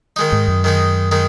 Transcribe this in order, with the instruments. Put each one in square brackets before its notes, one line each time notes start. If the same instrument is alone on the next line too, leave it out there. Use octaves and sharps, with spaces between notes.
[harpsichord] D#3 G#3 D#4
[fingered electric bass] G#2
F#2
[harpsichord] D#3 G#3 D#4
D#3 G#3 D#4